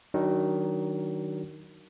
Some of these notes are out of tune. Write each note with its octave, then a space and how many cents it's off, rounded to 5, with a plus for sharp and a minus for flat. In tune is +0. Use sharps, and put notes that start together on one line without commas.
D#3 +0 F#3 +25 D4 +0